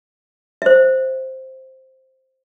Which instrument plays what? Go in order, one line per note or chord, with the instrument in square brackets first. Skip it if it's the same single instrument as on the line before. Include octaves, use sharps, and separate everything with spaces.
[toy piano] C5 E5